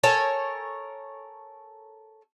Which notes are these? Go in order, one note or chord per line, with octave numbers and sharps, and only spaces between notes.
A4 A#4 C#5 G#5